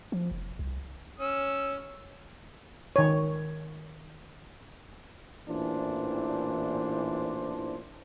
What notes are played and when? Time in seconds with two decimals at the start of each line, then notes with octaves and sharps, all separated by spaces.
0.12 F3
0.31 F1
0.59 C2
1.20 C#4 E6
2.96 D#3 C#5
5.48 A1 A#2 E3 D4 C5